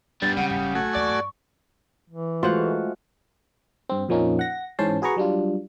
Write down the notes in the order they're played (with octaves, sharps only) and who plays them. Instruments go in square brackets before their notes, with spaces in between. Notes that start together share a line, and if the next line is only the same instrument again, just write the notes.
[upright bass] F#2 [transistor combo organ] G3 [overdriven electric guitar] B3 D4 [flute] A6
[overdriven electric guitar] C#3 [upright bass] G#3 C4 [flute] F#5
[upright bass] F#1 G#2 [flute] F#5
[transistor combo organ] A3 F#4 G#5
[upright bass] D#2 A#3 [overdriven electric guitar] D5 [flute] C#6
[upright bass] G2
[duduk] E3
[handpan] G#3 A3 F#4 [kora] F4 C5 F#5
[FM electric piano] G2 C4
F2 A#2 F3 A#3 C#4 D#4
F#5 A#6
G#2 E3 C#4 C5 A5 C6
F#4 G#4 B4 A#5 C#6
F#3 G3 D4 F4